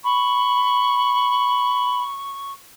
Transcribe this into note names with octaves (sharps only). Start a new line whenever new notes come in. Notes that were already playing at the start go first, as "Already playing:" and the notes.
B5 C#6